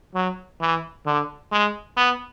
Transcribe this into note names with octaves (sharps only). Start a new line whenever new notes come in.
F#3
E3
D3
G#3
B3